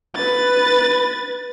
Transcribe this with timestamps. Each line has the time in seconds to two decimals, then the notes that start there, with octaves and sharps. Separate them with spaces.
0.16 B4 A6